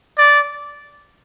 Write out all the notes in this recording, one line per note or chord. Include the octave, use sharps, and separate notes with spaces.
D5